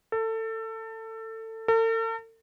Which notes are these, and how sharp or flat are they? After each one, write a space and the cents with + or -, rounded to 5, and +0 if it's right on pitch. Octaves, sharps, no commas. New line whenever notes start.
A4 +25
A4 +45